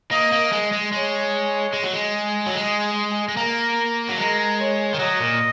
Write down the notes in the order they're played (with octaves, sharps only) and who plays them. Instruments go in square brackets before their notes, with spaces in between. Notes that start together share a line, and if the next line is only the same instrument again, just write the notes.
[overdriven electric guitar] A#3 [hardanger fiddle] D#5
[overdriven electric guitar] A#3
G#3
G#3
[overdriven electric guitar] G#3 [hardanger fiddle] C#5
[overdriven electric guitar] G#3
F#3
G#3
F#3
[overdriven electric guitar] G#3 [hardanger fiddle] G#4
[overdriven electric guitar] G#3
[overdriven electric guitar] A#3 [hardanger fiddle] A#4
[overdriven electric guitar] F#3
[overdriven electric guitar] G#3 [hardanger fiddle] A#4
[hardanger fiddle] C#5
[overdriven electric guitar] D#3
[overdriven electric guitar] F#3 [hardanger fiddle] D#5
[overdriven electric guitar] A#2